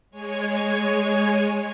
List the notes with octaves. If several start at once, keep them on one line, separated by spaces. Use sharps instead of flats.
G#3 C#5 G#5